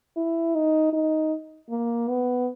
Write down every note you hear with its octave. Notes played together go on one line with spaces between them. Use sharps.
E4
D#4
D#4
A#3
B3